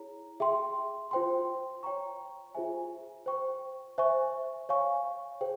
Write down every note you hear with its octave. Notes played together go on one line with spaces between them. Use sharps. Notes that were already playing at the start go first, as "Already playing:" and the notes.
Already playing: E4 G#4 C#5 A#5
G#4 E5 G5 C6
F4 C5 G5 C6
C#5 G5 A#5 C#6
F4 G#4 C5 E5 G#5
C5 G5 C#6
C5 E5 G#5 C#6
C#5 F5 G#5 C#6
G#4 C5 G5